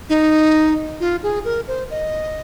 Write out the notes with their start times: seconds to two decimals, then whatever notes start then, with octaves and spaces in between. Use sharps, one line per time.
0.09 D#4
1.00 F4
1.23 G#4
1.45 A#4
1.68 C5
1.90 D#5